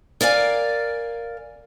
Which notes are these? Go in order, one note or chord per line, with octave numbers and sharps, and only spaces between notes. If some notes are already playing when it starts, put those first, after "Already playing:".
A#4 D5 F5 G#5